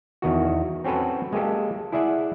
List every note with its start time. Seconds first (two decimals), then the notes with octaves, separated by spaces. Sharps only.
0.22 E2 D#3 F#4
0.84 C4 C#4 F#4 A4 B4
1.32 G#3 A#3 G4 A4
1.92 E4 G#4 D5 E5 F#5